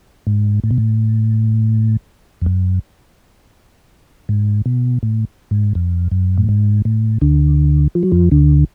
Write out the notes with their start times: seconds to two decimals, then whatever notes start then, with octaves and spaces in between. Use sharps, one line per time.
0.27 G#2
0.64 A2
0.71 B2
0.78 A2
2.42 F2
2.46 F#2
4.29 G#2
4.66 B2
5.03 A2
5.51 G#2
5.75 F2
6.11 F#2
6.37 A2
6.49 G#2
6.85 A2
7.21 D2 D3
7.95 F3
8.03 F#3
8.12 F2 F3
8.31 D2 D3